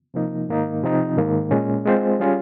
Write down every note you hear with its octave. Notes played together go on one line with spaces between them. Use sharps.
C3 F3 A#3 D#4
G#2 D#3 A#3 D#4
C3 F3 C4 D#4
G#2 D#3 A#3
A#2 G#3 C#4
G#3 C4 F4 C5
G3 C#4 F4 G#4 C#5